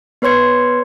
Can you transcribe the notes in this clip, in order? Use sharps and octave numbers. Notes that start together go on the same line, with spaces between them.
B3 B4 C#5 C6 G#6 C#7